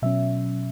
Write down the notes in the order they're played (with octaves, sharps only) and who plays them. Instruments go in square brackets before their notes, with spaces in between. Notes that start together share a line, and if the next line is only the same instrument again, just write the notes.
[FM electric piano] B2 F#3 C#4 E5